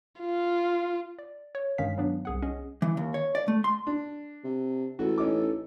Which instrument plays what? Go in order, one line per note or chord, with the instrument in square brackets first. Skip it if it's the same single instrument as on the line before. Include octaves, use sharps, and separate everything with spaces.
[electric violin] F4
[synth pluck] D5
C#5
G2 D#3 G#3 C#4 F5 B6
F#3 B3 D4
C2 G#4 F#5
C#4 G#4 D#5
[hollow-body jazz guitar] E3
D#2
C#5
D5
A3
C6
[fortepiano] D4
[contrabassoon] C3
[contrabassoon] A1 [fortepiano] F#4 [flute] A4
[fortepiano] C#4 D#4 D6